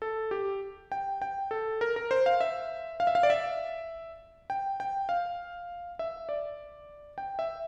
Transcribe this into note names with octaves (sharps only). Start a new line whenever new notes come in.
A4
G4
G5
G5
A4
A#4
A#4
C5
F5
E5
F5
E5
F5
D5
E5
G5
G5
F5
E5
D5
G5
E5